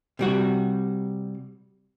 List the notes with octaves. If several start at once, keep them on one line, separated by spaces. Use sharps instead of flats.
C3 G3 F#4